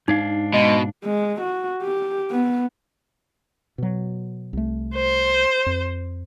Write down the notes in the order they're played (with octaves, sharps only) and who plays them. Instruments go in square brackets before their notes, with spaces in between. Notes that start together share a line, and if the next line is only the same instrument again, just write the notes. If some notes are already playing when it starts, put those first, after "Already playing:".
[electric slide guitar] G#2 D4 F5 [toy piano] D#4
[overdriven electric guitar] B2 [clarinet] G#3
[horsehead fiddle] G#3
F#4
G4
B3
[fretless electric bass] B2 F#3
C2 A3
[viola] C5
[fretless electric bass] F2